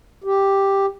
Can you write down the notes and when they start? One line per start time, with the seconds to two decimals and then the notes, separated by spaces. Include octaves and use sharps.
0.24 G4